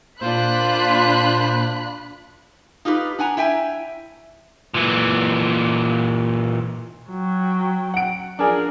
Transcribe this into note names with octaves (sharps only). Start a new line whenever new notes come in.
A#2 D4 F4 C5 B5 F#6
D#4 F4 G4 G#4 B4
D4 F#5 G#5 A#5
E4 E5 G5 G#5
A#2 E3
F#3 G5
F#5 D7
F3 D4 G#4 A#4